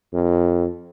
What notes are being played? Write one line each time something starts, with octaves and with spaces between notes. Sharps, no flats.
F2